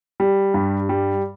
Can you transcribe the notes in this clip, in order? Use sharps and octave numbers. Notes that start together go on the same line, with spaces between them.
G3
G2
G3